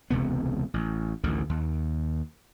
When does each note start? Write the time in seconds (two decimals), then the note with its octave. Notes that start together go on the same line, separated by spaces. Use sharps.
0.10 E1 C#2 C3 B3
0.74 A1
1.24 A1 D2 D3 D#3
1.49 D#2